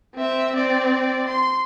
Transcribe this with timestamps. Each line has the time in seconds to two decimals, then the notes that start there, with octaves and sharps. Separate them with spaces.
0.15 C4 E5
0.56 C4 D5
1.28 C6